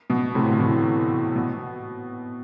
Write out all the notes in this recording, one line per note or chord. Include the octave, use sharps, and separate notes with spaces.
B2
A2 C3
D3
C3 E3
B2